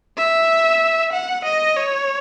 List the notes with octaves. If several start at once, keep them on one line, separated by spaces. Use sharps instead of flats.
E5
F#5
D#5
C#5